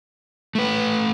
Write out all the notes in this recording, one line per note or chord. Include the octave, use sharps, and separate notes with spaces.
A3 B4